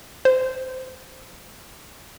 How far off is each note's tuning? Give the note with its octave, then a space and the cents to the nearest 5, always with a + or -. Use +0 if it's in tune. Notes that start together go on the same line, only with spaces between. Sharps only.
C5 -15